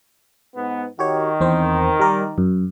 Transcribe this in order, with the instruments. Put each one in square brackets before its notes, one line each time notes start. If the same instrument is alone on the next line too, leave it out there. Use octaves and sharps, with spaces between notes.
[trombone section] G#2 B3
[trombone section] D#3 [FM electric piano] F#4 G4 C#5
[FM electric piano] E2 C4 C5
G3 A#4 D5
F#2